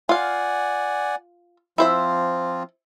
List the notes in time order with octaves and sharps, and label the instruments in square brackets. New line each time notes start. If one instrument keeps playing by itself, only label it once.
[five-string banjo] F4 F5 [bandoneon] D5 F#5 G#5
[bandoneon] F3 C4 F4 [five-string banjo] E4 C5 E5